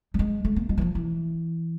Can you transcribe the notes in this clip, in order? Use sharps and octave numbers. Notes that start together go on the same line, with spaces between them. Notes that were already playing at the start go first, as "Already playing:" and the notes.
G3
G#3
A3
A#3
G#3
E3
F3
E3